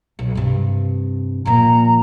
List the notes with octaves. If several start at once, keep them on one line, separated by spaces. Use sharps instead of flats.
B1
G2 C3
A#2 F3 A#5